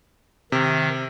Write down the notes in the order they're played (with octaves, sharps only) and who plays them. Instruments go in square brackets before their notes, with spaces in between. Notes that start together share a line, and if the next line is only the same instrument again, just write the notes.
[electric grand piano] C3 [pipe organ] D#3